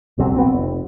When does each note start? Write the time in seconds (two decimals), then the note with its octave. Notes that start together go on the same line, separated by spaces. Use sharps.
0.18 E1 C2 F#3 C4
0.36 A1 B3 C4
0.53 F1